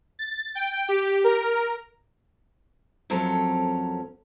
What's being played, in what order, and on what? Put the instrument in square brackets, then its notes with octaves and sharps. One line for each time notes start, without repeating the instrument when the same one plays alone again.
[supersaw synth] A6
G5
G4
A#4
[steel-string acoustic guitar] F2 F#3 C4 C#4 A4 A#4